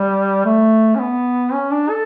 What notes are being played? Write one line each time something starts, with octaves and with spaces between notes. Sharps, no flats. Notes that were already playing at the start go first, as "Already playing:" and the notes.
Already playing: G3
A3
C#4
B3
C#4
D4
A4